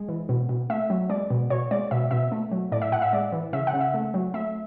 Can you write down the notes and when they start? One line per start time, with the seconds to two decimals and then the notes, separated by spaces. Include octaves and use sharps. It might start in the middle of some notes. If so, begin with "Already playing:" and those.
Already playing: G#3
0.08 E3
0.29 B2
0.49 B2
0.70 A3 E5
0.90 F#3
1.10 G#3 D5
1.30 B2
1.50 B2 C#5
1.71 G#3 D5
1.91 B2 E5
2.11 B2 E5
2.32 A3
2.52 F#3
2.72 A2 D5
2.82 E5
2.92 A2 F#5
3.02 E5
3.13 G#3 D5
3.32 E3
3.53 C#3 E5
3.67 F#5
3.73 C#3
3.80 E5
3.94 A3
4.14 F#3
4.34 A3 E5